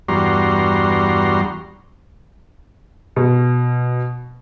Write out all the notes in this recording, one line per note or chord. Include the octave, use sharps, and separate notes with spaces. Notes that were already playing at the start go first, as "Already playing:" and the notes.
E2 G2 G3 F#4 A#5 C6
B2